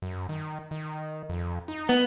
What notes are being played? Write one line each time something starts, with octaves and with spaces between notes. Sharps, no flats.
F#2
D#3
D#3
F2
D#4
B3